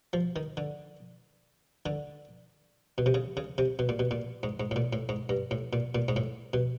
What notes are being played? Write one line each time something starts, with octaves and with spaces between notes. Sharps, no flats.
F3
D#3
D3
D3
B2
C3
C#3
C#3
C3
B2
A#2
B2
A#2
G#2
G#2
A2
A#2
A2
G#2
G2
A2
A#2
A#2
G#2
A2
B2